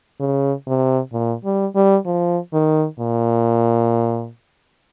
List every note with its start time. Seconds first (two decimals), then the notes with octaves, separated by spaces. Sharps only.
0.20 C#3
0.67 C3
1.13 A#2
1.45 G3
1.75 G3
2.06 F3
2.53 D#3
2.99 A#2